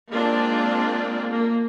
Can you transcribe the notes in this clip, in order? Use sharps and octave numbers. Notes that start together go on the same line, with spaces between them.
G#3 A#3 C4 D4 F4 D5
A#3